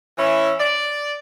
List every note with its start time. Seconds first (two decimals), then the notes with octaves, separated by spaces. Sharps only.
0.18 E3 C#4 E4
0.60 D5